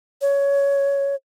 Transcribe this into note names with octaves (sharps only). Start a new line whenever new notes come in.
C#5